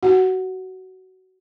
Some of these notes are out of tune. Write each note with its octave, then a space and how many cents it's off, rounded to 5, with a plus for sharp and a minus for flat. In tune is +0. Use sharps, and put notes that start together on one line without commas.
F#4 +20 F#5 +0